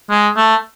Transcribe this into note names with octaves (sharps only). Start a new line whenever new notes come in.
G#3
A3